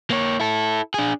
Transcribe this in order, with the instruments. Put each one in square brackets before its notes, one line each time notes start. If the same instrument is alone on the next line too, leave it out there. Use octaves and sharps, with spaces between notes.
[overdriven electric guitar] A#3 C#5
E4 A4
D4 G#4